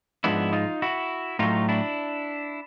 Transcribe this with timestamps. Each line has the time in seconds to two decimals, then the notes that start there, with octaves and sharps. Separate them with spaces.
0.24 G#2 F3 G#3 B3 D4 E4
0.53 D#4 F4
0.82 E4 F#4
1.39 A2 F#3 A3 D#4 F4
1.69 D4 E4